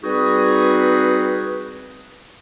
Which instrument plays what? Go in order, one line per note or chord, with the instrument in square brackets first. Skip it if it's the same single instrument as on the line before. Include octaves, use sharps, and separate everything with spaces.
[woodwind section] G3 C4 D#4 F#4 G#4 B4